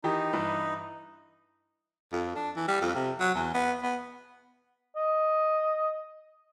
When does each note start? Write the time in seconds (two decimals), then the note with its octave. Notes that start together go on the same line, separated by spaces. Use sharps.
0.04 D#3 E3 D#4 G4
0.33 G2 E3
2.12 F2
2.36 D4
2.56 E3
2.68 G3
2.81 F2
2.96 C3
3.20 F#3
3.35 E2
3.54 B3
3.83 B3
4.96 D#5